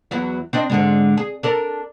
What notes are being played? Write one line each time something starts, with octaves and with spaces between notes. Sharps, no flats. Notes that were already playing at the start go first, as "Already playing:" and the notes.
E2 F#3 E4
C4 D4 D#5
G#2 D3 G#3
G#4
D4 A4 A#4